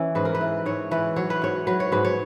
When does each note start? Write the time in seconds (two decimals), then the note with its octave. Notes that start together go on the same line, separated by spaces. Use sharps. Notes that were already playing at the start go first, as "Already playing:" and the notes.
Already playing: E3 C#4
0.15 G#2 B4
0.25 A#4
0.35 B4
0.41 E3
0.66 G#2 C#5
0.91 E3 B4
1.16 F#3 C#5
1.30 B4
1.42 G#2 C#5
1.67 F#3 B4
1.80 C#5
1.92 G#2 B4
2.05 C#5